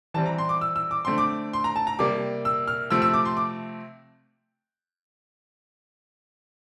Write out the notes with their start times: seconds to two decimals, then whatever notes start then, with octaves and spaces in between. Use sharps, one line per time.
0.14 E3 G3 C4 A5
0.26 A#5
0.38 C6
0.49 D6
0.61 E6
0.76 E6
0.91 D6
1.05 D3 A3 C4 C6
1.18 D6
1.53 C6
1.64 A#5
1.76 A5
1.87 A#5
1.99 C3 G3 A#3 D6
2.45 E6
2.68 F6
2.90 C3 F3 A3 C4 E6
3.02 E6
3.14 D6
3.25 C6
3.37 D6